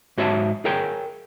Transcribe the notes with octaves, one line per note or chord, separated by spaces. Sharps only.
G#2 F#4 C#5 E5 A5
G#4 A#4 C#5 F5 G5